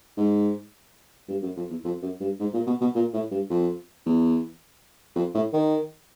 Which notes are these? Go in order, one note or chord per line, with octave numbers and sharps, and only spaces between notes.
G#2
G2
F#2
F2
E2
F2
F#2
G2
G#2
A#2
B2
B2
A#2
A2
G2
F2
E2
F2
A2
D#3